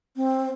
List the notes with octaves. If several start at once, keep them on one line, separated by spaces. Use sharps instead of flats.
C4